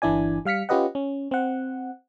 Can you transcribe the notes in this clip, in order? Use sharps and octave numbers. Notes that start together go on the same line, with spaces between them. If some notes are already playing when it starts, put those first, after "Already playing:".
G1 E3 D4 E4 D5 G#5
G3 F5 F6 B6 C#7
C#4 F4 G4 B4 D#5 F#5
C#4
C4 F#5